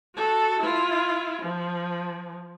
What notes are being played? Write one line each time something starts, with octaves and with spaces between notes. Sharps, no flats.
F#4 A4
E4 F4
F3